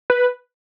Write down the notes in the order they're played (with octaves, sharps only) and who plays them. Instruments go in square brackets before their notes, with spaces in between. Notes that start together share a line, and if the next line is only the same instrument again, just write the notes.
[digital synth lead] B4